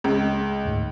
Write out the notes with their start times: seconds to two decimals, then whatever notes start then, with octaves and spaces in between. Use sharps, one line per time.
0.04 C#2
0.65 D2 G#2